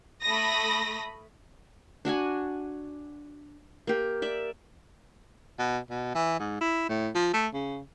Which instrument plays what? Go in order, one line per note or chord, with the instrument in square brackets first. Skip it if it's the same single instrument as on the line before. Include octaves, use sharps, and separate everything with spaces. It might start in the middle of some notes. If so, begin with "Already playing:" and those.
[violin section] A3 B5 D#6 A#6
[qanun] D4 F#4 F#5 G#5
A#3 G4
D5 E5
[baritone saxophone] B2
B2
E3
G#2
E4
A2
F3
A3
C#3